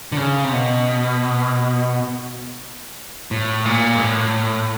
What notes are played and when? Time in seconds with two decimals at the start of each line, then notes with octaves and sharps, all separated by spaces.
0.12 D3
0.17 C#3
0.44 C3
0.52 B2
3.31 A2
3.65 A#2
3.95 G#2
4.00 A2